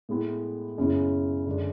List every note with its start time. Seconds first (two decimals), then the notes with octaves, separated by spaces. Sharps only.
0.09 A2 G#3 B3 E4
0.78 F#2 C#3 G#3 B3 E4
1.46 F#2 D3 G#3 D4